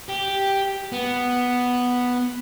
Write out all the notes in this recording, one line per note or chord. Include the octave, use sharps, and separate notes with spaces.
G4
B3